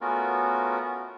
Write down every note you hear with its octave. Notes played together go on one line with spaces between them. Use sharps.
A3 B3 C#4 F4 F#4 A#4